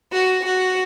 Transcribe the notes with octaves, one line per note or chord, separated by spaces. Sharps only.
F#4
F#4